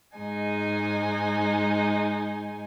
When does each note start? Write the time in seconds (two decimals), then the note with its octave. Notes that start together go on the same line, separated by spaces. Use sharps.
0.17 G#2 G#3 D#4 G#5